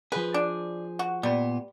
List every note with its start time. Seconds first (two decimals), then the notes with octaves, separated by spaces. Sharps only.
0.12 F3 G#4 B4
0.34 D4
0.99 F#4
1.23 A#2 G3 B3